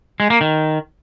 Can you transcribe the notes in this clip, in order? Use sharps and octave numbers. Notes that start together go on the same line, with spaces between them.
G#3
A#3
D#3